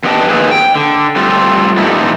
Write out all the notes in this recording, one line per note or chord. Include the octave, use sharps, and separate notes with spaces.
E2 B3 D4 G4 D#5 A5
D#3 A#3 C4 D#4 G#4 B4
G5
D3
G3 A3 C4 F4
A#2 E3 G3 A3 D#4 E4